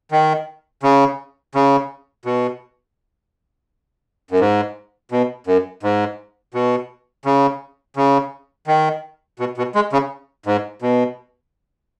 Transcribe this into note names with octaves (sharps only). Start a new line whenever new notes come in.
D#3
C#3
C#3
B2
F#2
G#2
B2
F#2
G#2
B2
C#3
C#3
D#3
B2
B2
G#3
C#3
G#2
B2